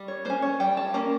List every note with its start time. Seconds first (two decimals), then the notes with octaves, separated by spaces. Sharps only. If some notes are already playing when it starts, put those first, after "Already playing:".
Already playing: G3
0.08 C#5
0.25 A#3 C#4 C5
0.42 C#5
0.60 G3 G5
0.77 A5
0.94 A#3 C#4 A#5